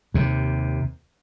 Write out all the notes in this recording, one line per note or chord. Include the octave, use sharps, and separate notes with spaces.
D#2 C3